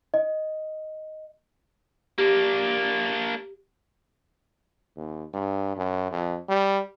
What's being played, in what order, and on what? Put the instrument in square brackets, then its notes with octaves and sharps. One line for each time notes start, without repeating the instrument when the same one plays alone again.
[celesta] D#5
[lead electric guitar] A#3 D4 [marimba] G4
[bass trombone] D#2
G2
F#2
F2
G3